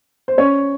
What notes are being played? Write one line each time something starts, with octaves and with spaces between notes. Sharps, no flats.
C5
C#4 C#5